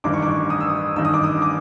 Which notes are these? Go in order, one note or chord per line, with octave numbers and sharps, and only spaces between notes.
A1 G2 D#3 D6
C#6
D6
D#6
E6
D#6
A1 G2 D#3 E6
D#6
D6
D#6
D6